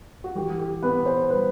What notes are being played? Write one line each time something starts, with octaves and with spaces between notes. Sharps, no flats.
F#4
E3 G4
G4
B3 B4
C5
G3 B4